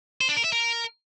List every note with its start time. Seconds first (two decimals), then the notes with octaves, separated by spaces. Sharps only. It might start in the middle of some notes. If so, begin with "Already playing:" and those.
0.21 C5
0.29 D4
0.37 A#4
0.44 E5
0.52 A#4